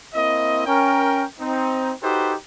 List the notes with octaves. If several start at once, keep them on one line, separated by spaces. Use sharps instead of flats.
A#3 C4 E4 D#5
C#4 A#4 G5
C4 D#4
D#4 F#4 G4 A4 B4 C5